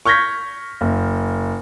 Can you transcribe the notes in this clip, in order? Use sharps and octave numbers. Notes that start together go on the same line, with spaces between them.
C#6 F6 G6 G#6 A#6 B6
F#1